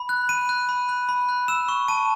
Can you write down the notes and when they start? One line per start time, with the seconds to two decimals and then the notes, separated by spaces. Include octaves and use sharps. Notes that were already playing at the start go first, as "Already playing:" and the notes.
Already playing: B5
0.09 F#6
0.29 B5 D#7
0.49 F#6
0.69 B5
0.89 F#6
1.09 B5
1.29 F#6
1.48 E6 E7
1.68 C#6
1.88 A5 D#7